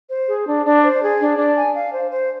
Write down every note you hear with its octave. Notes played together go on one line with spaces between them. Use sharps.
C5
G#4
D4
D4
C5
G#4
D4
D4
G#5
F5
C5
C5